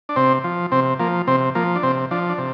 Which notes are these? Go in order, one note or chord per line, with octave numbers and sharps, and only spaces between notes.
D4
C3 C4
F3
C3 C4
F3 A#3
C3 C4
F3 A#3
D4
C3 C4
F3 D4
D4
C3